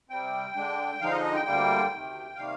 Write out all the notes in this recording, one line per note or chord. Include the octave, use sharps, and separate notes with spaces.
C3 G3 C4 G5
D3 G#3 D4
D3 F3 G#3 D#4 F5
D#5
D#5
G5
D2 D3 G3 A#3 G5
D2 C3 D#3
C3 D#3 G3 A#3 F5